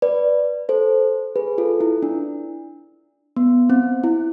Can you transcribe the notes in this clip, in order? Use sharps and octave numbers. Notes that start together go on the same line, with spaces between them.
B4 D5
A4 C5
G#4 B4
F4 A4
E4
D4
B3
C4
E4